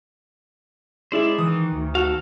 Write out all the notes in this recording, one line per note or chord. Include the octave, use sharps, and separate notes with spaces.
G#3 E4 C5 D5 E5
D#3 E3 D#6
D2
D#3 F#4 A4 F5